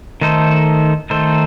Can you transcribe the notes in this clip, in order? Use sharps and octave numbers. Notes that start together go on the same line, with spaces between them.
D#3 A3 D#4 A4 C5
D#3 A3 D#4 A4 C5